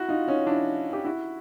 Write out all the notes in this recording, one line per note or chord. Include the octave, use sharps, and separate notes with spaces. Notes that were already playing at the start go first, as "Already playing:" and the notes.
Already playing: E4 F#4
D#4 F4
C#4 D#4
D4 E4
G4
E4 F#4